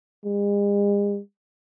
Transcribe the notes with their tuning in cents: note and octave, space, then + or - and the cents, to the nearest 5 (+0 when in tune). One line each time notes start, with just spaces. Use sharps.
G#3 -45